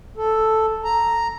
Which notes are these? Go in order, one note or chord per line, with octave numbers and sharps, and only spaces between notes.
A4
A#5